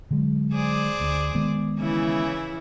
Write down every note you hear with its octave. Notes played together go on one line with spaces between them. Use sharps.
D3 F#3 G#3
G#4 C5 D5
D2
D#3 G#3 B3
C#3 E3 E4